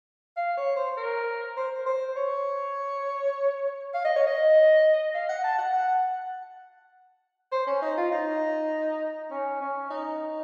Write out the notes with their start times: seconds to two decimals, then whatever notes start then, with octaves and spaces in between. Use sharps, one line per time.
0.37 F5
0.57 C#5
0.76 C5
0.97 A#4
1.57 C5
1.86 C5
2.16 C#5
3.94 F5
4.05 D#5
4.16 C#5
4.27 D#5
5.14 F5
5.29 F#5
5.44 A5
5.59 F#5
5.74 F#5
7.52 C5
7.67 C#4
7.82 D#4
7.97 F4
8.11 D#4
9.31 C#4
9.61 C#4
9.90 D#4